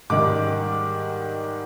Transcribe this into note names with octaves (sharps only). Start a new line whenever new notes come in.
G#2 D#3 G3 D6